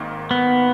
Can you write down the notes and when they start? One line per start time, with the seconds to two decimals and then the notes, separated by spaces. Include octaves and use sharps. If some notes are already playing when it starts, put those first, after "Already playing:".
Already playing: G#1 G#2 D#3 A#3
0.31 B3